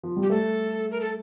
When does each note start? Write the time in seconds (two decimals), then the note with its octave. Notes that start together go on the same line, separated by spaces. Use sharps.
0.03 F3
0.17 G3
0.23 G4
0.30 A3 A4
0.91 A#4
1.01 A4